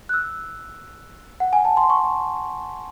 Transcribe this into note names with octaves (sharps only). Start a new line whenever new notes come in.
F#6
E6
F#5
G#5
A5
C6
C#6